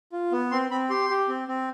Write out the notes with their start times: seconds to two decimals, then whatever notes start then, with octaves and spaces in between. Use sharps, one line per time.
0.12 F4
0.32 B3
0.51 C4 C6
0.71 C4 B5
0.90 G4 C6
1.10 G4
1.28 C4
1.48 C4